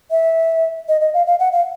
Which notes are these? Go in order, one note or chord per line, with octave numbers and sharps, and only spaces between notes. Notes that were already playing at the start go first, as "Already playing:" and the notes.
E5
D#5
D#5
F5
F5
F#5
F5